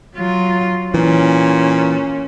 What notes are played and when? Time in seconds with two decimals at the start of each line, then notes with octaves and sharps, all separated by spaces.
0.16 F#3 F4
0.94 A#2 E3 C#4